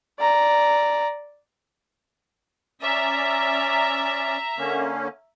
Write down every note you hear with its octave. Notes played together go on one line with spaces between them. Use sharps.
D5 A#5
C#4 D5 E5 A#5
D3 A#3 C#4